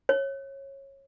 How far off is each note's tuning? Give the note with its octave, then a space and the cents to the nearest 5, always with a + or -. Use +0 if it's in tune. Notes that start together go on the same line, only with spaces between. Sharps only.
C#5 -20